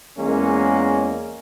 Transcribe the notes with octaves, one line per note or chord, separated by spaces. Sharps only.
E2 G#3 A#3 C#4